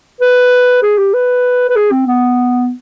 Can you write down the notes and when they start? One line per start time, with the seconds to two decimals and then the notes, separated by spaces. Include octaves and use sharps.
0.21 B4
0.82 G#4
0.98 G4
1.13 B4
1.69 B4
1.76 G#4
1.91 C4
2.07 B3